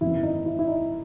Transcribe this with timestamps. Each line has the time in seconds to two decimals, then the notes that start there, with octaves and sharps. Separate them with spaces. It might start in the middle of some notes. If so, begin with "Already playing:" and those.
0.01 G#1 F#2 E3 B3 E4
0.23 D#4
0.46 E4
0.59 E4
0.68 D#4